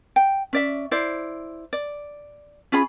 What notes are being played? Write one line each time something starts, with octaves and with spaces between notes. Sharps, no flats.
G5
C#4 D5 E5
E4 C5 D5
D5
C#4 F4 G#4 B5